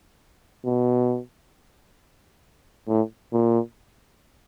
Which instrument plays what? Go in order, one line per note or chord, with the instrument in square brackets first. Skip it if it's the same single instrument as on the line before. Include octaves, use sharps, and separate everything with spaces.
[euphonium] B2
A2
A#2